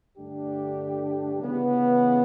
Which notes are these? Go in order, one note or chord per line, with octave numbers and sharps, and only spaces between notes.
G2 D3 A3 D4 G4
C#3 E3 B3